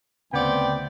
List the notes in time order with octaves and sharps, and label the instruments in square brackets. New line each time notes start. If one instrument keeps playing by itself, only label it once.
[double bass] D2 [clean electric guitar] C#3 [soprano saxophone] B3 [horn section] C4 D5 G5